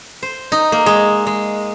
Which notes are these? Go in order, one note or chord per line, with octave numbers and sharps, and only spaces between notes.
C5
D#4
A#3
G#3
G#3